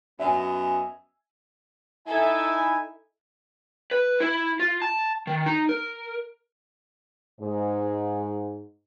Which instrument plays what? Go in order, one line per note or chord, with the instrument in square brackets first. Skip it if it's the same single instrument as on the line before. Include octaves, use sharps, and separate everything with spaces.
[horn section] F#2 B3 D#5 [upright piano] E5 G#5
[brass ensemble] D#4 E4 G#5 [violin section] A4 E5
[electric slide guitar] B4
E4
F4
A5
D#3
D#4
A#4
[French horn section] G#2